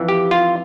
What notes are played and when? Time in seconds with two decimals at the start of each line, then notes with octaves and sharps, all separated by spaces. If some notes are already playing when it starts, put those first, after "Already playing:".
Already playing: F2 E3
0.08 G4
0.31 F4